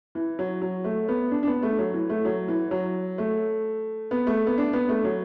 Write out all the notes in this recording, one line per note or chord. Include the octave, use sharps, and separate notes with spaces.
E3
F#3
F#3
A3
B3
D4
D4
B3
A3
F#3
E3
A3
F#3
E3
F#3
A3
B3
A3
B3
D4
B3
A3
F#3